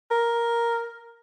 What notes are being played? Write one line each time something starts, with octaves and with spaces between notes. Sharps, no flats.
A#4